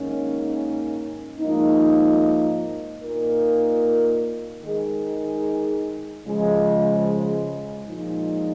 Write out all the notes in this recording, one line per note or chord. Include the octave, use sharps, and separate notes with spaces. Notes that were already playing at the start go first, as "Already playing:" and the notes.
Already playing: G#2 D#3 A#3 C#4
G#2 F3 A#3 D#4
A#2 A#3 D#4 A#4
D#3 G#3 D#4 G#4
C#3 F3 G#3
A#2 F3 G#3 D#4